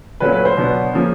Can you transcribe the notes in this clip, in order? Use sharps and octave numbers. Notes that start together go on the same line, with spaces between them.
A#2 F#3 A3 C#4 B4
B4
C5
B2 F#3 B3 D4
C#3 F3 A#3 C#4